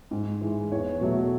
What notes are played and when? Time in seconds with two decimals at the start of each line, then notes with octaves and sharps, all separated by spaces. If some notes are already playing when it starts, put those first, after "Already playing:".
0.11 G#2
0.41 E3 G#3
0.72 E2 C#5
1.01 B2 F#3 A3